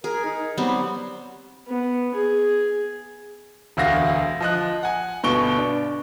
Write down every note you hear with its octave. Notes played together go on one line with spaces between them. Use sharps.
G#4 A#4
D#4
F#3 G3 B3 C4
B3
G#4
E1 D2 F5 F#5 A#6
F3 D#5 F#6
F#5 G#5
G1 B2 C#6 D7 G7
D4